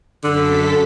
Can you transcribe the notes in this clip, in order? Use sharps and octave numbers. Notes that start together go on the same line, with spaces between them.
F#2 D3 A4 B6